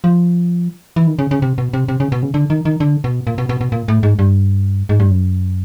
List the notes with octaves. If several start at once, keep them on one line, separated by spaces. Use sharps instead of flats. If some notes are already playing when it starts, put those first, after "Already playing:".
F3
E3
D#3
C#3
C#3
C3
B2
C3
C3
C#3
B2
C#3
D3
D#3
D#3
D3
B2
A#2
B2
B2
B2
A#2
A2
G#2
G2
G#2
G2
F#2